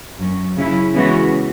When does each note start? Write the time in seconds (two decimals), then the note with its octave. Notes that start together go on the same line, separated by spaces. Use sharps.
0.19 F#2 F#3 C#4
0.57 C#3 F#3 C#4 E4
0.94 C#3 E3 G#3 B3 F#4